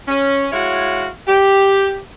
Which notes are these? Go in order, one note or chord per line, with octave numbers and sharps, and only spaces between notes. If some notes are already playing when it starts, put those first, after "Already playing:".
C#4
G#3 E4 F#4 C#5 F5
G4